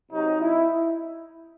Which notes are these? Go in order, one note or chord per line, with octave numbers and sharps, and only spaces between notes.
C3 F#3 D#4
E4